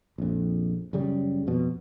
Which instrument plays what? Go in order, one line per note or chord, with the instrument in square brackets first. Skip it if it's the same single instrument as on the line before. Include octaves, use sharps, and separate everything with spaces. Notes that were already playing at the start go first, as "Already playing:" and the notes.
[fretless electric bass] A#1 F2
F#2 C#3 G3
F2 B2